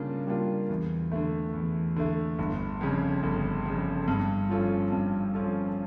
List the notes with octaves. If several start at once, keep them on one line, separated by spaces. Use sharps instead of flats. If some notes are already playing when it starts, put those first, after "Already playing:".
Already playing: C#3 G3 A#3 D4 F4
G3 A#3 D4 F4
E2
D3 A3
E2
D3 A3
G1
F2 C#3
G1
F2 C#3
G2
F3 C#4 F4 A4
G2
F3 C#4 F4 A4